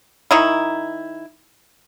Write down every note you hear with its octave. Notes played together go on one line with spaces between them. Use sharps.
D#3 D#4 E4